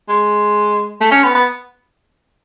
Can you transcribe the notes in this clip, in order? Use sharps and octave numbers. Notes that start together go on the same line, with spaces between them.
G#3
A3
C#4
B3
B3